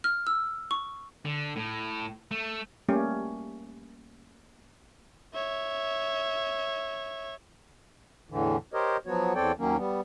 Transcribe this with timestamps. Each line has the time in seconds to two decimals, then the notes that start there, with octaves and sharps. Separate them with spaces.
0.04 F6
0.27 E6
0.71 C#6
1.25 D3
1.56 A2
2.31 A3
2.89 G3 A3 A#3 C#4 G4
5.34 C#5 E5
8.30 E2 A2 D3 E3
8.74 G4 A#4 C5 C#5 D#5
9.07 F3 F#3 B3 F#4 C#5
9.35 E2 C4 A4 C#5 D5 G5
9.59 D#2 D#3 F#3 A#3 C#4
9.77 G3 B3